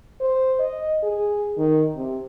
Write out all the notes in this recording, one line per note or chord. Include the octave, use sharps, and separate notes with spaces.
C5
D#5
G#4
D#3
C3